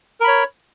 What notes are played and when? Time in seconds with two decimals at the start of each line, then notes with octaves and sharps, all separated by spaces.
0.21 A#4
0.24 B5
0.28 C#5